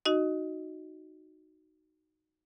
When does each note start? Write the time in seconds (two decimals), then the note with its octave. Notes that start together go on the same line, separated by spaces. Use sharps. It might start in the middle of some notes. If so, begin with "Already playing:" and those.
0.05 D#4 F#4 D#5